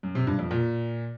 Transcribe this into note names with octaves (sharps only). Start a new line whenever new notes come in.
F#2
C3
G2
F2
A#2